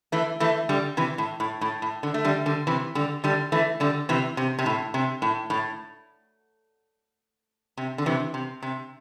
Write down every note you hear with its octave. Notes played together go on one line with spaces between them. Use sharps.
E3 A3
E3 A3
D3 G3
C3 E3
A2
A2
A2
A2
D3
A3
D3 G3
D3 G3
C3 E3
D3 G3
D3 G3
E3 A3
D3 G3
C3 E3
C3
C3
A2
C3
A2
A2
C3
D3
C3 E3
C3
C3